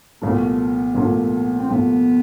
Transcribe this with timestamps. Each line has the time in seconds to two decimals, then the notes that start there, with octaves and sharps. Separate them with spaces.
0.22 C2 A#2 F3 A3 B3
0.95 C2 A#2 F3 A3
1.59 C4
1.69 C2 A#2 F3 A3 B3